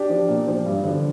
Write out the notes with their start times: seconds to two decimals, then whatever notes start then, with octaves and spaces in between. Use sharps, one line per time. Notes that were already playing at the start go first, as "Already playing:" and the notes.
Already playing: D4 G4
0.09 F3
0.28 A#2
0.47 F3
0.66 G2
0.84 D3 F3